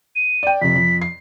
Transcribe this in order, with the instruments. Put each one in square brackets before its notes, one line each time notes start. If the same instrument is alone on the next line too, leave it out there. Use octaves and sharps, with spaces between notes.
[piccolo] D#7
[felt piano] D5 G5
[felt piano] F2 C3 [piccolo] B6
[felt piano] F2
C7